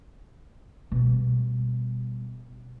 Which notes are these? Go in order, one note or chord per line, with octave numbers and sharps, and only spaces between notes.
B2 G3